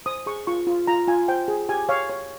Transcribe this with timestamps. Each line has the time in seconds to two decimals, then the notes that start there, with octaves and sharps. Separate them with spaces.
0.06 C5 D#6
0.26 G#4 C#6
0.47 F4 C#6
0.67 F4
0.87 F4 A#5
1.07 F4 G#5
1.28 C5 G5
1.48 G#4
1.69 G4 G#5
1.89 C#5 F5
2.09 C#5